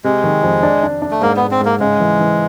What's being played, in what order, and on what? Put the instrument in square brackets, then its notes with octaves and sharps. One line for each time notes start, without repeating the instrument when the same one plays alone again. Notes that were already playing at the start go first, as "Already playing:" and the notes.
[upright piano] C3 [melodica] G#3
[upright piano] D#3
F2
D4
D4
D4
[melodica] A3
[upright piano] G#2 [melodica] A#3
[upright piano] G#2 [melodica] B3
[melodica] C4
[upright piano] G#2 [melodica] A#3
[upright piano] C#3 [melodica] G#3
[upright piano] E3
E3